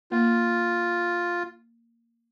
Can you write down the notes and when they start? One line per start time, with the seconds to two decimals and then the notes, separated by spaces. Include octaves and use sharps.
0.12 A#3 F4